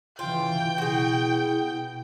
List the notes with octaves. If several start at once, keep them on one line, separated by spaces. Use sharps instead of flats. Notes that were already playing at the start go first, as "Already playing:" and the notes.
C#3 E3 F4 G5
B2 E4 F#4 G#4